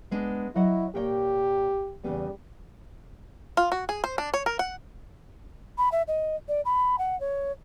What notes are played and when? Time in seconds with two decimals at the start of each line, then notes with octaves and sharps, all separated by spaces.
0.11 G#3 B3 D4
0.56 F#3 E4 D#5 F#5
0.95 A#2 G4 C#5 G5
2.04 E2 C#3 G3 B3
3.57 F4
3.72 F#4
3.89 G#4
4.04 C5
4.18 D4
4.34 C#5
4.46 A#4
4.59 F#5
5.78 B5
5.92 E5
6.08 D#5
6.48 D5
6.65 B5
6.98 F#5
7.20 C#5